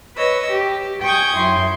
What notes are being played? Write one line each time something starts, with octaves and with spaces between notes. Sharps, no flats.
B4 C#5 D#5 E6
G4
G5 G#5 C#6 D#6 G6 G#6
F#2 E4 C6 G6